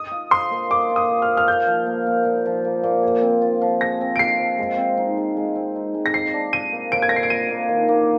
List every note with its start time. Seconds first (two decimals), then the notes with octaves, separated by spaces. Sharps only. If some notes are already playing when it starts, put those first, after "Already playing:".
Already playing: D#5 D#6
0.12 F4
0.31 C5 C6
0.51 A#3
0.70 D#5 D6
0.90 F4
0.96 D#6
1.09 C5
1.22 F6
1.28 A#3
1.37 F6
1.48 A#2 G6
1.67 F3
1.86 A#3
2.07 A#2
2.25 A#2
2.46 F3
2.65 A#3
2.83 A#2
3.03 G#4
3.22 C4
3.42 F4
3.62 F3
3.81 G#4 A#6
4.01 C4
4.16 D7
4.19 F4 C7
4.39 F3
4.58 G#3
4.77 C4
4.98 D#4
5.17 G#3
5.37 G#3
5.56 C4
5.76 D#4
5.94 G#3
6.06 A#6
6.14 C5 C7
6.33 D4
6.52 F4 D#7
6.72 A#3
6.91 C5 D7
7.02 G#6
7.09 D4 A#6
7.16 C7
7.23 D7
7.30 F4 D#7
7.50 A#3
7.69 D#3
7.88 A#3